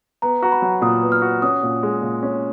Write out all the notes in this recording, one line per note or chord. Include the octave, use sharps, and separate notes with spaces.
B3 A#5
F#4 A#5
B5
F#3
A#2 D#6
B3
F6
F#4
C#4 D#6
A#2
G#3
A#2
C#4